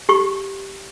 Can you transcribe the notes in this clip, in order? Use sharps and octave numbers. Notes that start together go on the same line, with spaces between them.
G4 C#6